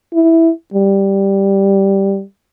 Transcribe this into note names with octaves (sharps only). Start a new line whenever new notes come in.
E4
G3